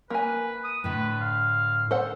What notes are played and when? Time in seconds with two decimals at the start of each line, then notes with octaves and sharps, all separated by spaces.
0.10 A#3 B4 G#5
0.64 D#6
0.84 A2 D3 B4
1.21 F5
1.91 A4 C5 F#5